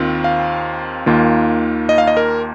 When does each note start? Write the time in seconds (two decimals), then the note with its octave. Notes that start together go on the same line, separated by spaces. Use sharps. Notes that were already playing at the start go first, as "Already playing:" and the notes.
Already playing: D#2 D#3 C4 F4
0.24 F5
1.06 D#2 D#3 A#3 F4
1.89 D#5
1.98 F5
2.07 D#5
2.17 A#4